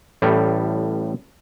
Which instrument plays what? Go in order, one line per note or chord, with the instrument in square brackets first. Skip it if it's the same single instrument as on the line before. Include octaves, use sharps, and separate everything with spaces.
[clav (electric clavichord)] A1 A2 G3